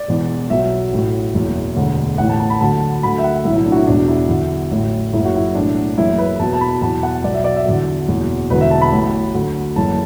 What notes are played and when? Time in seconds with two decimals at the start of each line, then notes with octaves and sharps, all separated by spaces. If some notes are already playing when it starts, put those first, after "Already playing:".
Already playing: D5
0.08 E1 E2 E3
0.50 B1 B2 F#3 E5
0.92 A1 A2 F#3
1.34 F#1 E2 B2
1.77 E1 D2 D3
2.18 A1 A2 E3 F#5
2.29 A5
2.40 A5
2.50 B5
2.61 D2 D3 F#3 A5
3.03 D2 D3 F#3 B5
3.18 E5
3.24 F#5
3.45 B1 A2 E3 E5
3.56 E4
3.65 D4
3.72 F#4
3.76 E4
3.87 E1 E2 B2 F#3 D4
4.08 E4
4.29 E2 D3 F#3
4.71 A1 A2 F#3
5.13 F#1 F#2 F#3 E4
5.25 F#4
5.36 E4
5.55 B1 A2 E3 D4
5.98 F#1 F#2 E3 E4
6.18 B4
6.39 E2 B2 F#3 A5
6.53 A5
6.61 B5
6.82 E2 B2 F#3 A5
7.03 F#5
7.24 B1 B2 F#3 D5
7.34 E5
7.44 D5
7.56 E5
7.66 E2 D3 F#3
8.08 F#1 E2 B2 F#3
8.50 E1 E2 D3 F#3 B4
8.61 E5
8.71 A5
8.82 B5
8.92 A1 A2 F#3
9.34 D2 D3 F#3
9.76 F#1 F#2 E3 A5